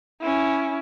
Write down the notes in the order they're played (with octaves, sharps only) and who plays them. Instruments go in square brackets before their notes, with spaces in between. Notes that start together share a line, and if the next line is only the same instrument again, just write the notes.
[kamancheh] C#4 E4